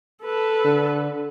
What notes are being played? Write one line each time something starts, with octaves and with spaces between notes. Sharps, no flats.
A4 B4
D3